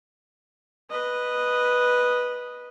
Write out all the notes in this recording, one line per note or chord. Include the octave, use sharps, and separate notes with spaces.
B4 D#5